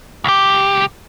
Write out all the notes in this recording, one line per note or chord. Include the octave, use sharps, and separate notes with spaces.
C#2 G4